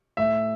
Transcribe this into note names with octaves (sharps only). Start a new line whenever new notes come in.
A2 E5